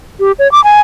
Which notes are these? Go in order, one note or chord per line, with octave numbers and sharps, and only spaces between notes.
G4
C#5
D6
G#5